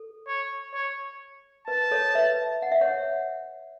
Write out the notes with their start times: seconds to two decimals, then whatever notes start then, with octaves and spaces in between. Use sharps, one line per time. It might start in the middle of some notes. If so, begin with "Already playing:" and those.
Already playing: A4
0.27 C#5
0.74 C#5
1.67 B4 A5
1.91 A4 C#5
2.15 B4 E5
2.62 F#5
2.72 E5
2.81 C#5 F#5